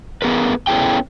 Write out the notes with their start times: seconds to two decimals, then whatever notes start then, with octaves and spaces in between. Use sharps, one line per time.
0.22 B3 G#4 A#4 B4
0.67 B3 C#4 E4 G#4 A4 G5